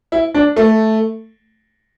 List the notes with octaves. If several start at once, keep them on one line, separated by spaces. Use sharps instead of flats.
E4
D4
A3